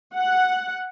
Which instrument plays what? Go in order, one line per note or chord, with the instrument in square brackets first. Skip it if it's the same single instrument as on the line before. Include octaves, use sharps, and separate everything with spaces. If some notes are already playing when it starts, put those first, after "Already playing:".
[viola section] F#5